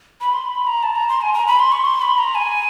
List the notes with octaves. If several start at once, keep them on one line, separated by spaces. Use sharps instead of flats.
B5
C6
B5
A#5
A5
A#5
C6
G#5
A#5
B5
C6
C#6
C6
B5
A#5
G#5